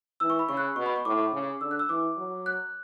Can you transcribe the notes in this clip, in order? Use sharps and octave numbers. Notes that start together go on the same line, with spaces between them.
E3 E6
C#6
B5
C#3 C#6
F#6
B2 C#6
B5
C#6
A2 D6
C#3
D3 E6
F#6
E6
E3 D6
F#3
F#6